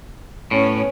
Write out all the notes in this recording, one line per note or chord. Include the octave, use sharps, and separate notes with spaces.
A2 B3 C#4